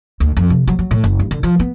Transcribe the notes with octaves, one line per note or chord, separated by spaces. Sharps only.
D2
F2
C3
F#3
F#3
A2
F#1
G2
D3
F3
B3